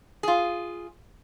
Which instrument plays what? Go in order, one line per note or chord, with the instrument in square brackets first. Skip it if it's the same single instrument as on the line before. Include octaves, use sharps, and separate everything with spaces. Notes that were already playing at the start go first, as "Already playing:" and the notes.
[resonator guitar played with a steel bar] F4 G#4